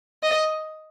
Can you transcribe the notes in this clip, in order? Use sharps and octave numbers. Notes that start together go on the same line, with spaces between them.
D#5